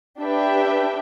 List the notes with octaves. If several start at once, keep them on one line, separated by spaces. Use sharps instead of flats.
D4 G4 B4 E5 G5